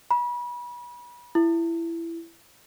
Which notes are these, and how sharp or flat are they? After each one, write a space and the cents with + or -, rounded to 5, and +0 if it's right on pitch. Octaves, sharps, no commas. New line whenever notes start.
B5 -30
E4 +20